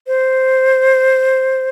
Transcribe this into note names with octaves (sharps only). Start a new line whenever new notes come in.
C5